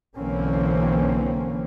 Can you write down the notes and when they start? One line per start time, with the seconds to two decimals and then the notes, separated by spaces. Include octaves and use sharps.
0.17 B1 D3 E3 A#3 C4 C#4